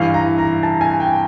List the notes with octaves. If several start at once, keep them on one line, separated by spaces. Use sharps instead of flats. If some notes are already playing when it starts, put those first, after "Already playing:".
Already playing: G2 E3 F5
A#5
A#5
A5
G#5
G5